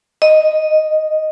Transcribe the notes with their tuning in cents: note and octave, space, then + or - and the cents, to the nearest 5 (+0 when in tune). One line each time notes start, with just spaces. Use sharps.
D#5 -5